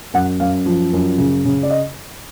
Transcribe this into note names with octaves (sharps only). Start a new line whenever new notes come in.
F#2 F#5
F#2 F5
F3
F#2
C#3
C#3
D5
D#5